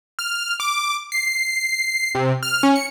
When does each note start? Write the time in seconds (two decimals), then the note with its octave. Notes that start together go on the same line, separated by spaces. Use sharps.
0.19 F6
0.60 D6
1.12 C7
2.15 C3
2.43 F6
2.63 C#4
2.76 C#7